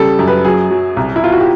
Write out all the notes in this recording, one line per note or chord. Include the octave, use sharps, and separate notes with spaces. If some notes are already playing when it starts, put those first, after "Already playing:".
Already playing: C#3 G3 A4
F#2
B4
F#3 G#4
F#3
C2
E4
B2 F4
F#4
G4